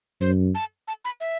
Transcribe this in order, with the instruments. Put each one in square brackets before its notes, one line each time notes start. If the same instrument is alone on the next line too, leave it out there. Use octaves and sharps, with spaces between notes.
[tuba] F#2 [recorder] C5
[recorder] A5
A5
B5
E5